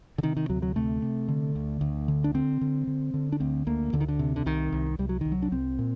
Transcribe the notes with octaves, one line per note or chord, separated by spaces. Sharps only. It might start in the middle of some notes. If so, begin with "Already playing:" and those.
D3
C3 D#3
D#3
D2 F#3
F#3
C3 A3
C3
D3
D2
D2
D3
D4
D3 C4
D3
D3
D3
D4
D2 C4
D2 A#3
D2 D3
D#3
D3
C3
D3
C2 D#3
C2
C2 G3
F#3
C2 D#3
F#3
D4
C2 C4
A#2